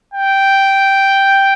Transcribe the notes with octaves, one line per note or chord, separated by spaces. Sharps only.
G5